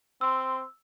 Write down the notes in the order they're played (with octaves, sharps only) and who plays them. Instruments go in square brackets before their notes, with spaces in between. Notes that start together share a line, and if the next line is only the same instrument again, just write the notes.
[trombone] C4 [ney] C6 [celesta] E6